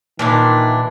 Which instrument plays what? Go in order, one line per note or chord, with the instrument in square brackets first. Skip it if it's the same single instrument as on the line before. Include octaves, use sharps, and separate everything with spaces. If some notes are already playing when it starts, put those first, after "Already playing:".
[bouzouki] A#2 E3 D4 [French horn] D#3